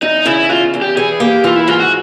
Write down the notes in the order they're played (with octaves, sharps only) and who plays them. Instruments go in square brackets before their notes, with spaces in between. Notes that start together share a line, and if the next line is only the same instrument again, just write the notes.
[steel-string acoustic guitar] E2 [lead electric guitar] D#4
[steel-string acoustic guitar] C#3 [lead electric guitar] E4
[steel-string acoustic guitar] E2 [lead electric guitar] F4
[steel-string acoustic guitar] E2
[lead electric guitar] G4
[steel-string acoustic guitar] E3 [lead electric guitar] G#4
[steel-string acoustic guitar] A#3 [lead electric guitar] G4
[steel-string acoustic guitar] E3 [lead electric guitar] F4
[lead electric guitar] E4
[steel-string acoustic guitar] G#2 [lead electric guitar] F4
[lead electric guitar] F#4